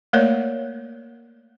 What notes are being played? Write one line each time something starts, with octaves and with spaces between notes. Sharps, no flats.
A3 A#3 A#4 C#5 D5